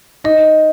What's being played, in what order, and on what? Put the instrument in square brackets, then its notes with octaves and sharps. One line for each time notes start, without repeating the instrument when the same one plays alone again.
[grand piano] D#4 [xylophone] D#5